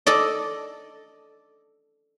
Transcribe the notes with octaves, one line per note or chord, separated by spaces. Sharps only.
A4 D5 D#5